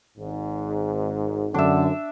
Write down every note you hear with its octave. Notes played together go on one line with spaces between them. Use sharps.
G#1 G#2
F#2 D3 D4 E5